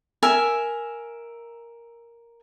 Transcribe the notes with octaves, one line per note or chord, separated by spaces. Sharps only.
A#4 E5 G#5